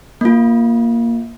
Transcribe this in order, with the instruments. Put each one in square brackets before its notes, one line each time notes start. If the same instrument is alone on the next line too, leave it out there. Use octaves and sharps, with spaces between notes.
[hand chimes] A#3 F4